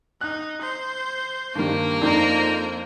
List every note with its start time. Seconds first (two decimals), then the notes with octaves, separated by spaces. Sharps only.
0.21 D#4 F#6
0.61 C5
1.55 G2 D#3 G3 A#3
2.02 F2 D4 D#4 C5 A#5